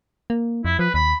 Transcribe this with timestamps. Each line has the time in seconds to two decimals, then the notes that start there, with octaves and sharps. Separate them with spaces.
0.30 A#3
0.65 F2 E4
0.79 F3 B4
0.94 D#2 B5